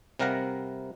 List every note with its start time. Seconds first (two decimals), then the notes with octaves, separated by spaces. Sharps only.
0.19 C3 G3 A#4 F5 F#5 A#5